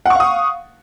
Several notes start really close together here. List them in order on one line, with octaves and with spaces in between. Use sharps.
F#5 C#6 F5 D#6